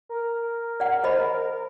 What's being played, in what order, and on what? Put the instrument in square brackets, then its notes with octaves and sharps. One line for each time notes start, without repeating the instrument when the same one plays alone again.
[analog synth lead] A#4
[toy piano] D5 F#5
C5 D#5 B5